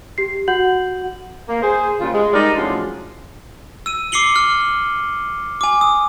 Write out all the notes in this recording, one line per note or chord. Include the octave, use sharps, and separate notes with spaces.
G4 C7
F#4 F#5 G6 F#7
A#3
G#4 C5
A#2 C#3 G3 F4
G#3
G3 D#4 A#4 D5
A2 F3 F#3 G#3 C#4 D4
E6 D#7
D6 E6 C7 C#7 F#7 G7
F6
G#5 D6
D#6